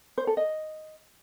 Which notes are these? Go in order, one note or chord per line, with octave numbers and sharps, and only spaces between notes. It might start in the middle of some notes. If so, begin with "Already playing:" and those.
C5
A4
D#5